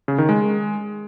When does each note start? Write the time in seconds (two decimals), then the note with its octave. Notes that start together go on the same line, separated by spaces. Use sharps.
0.08 C#3
0.18 D#3
0.29 G#3